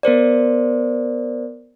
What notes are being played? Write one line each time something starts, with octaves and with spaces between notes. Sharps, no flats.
B3 A#4 C5 D5